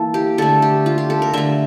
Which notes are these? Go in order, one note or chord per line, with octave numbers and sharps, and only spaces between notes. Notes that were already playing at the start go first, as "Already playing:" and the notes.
Already playing: E3 A#3 A4
G4
D3 A3 A4
G4
F4
G4
A4
A#4
D3 A3 E5